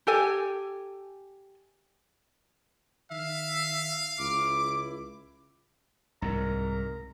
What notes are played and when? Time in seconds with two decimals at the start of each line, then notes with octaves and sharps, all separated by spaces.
0.07 G4 A4 G#5
3.11 D#3 E5 F5
4.19 C#2 E4 D6
6.22 C2 G#2 A#4 A#5